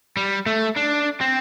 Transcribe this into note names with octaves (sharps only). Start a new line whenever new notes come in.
G3
A3
D4
C4